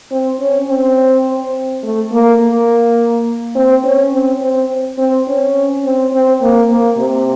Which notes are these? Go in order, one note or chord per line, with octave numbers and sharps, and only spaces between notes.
C4
C#4
C4
A3
A#3
A#3
C4
C#4
C4
C4
C4
C#4
C4
C4
A#3
A#3
C3